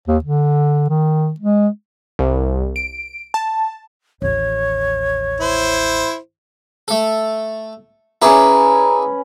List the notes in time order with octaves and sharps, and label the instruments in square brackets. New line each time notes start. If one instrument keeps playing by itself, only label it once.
[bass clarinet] D#2
D3
D#3
G#3
[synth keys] C2
D7
A5
[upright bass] A1 D#2 [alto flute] C#5
[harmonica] E4 C5
[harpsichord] A3 A4
[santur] C#4 B4 [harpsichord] E4 G#4 D5 [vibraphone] A#5